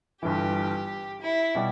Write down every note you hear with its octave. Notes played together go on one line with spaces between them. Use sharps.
G1 G2 E3 G4
E4
B2 G3